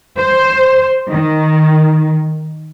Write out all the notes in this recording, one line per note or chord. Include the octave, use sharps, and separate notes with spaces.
C5
D#3